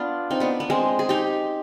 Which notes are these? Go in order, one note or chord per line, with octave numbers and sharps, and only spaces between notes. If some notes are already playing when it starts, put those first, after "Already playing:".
Already playing: B3 D4 F4
C4 D#4
B3 D4
B3
G#3 C4
G#4
D#4 G4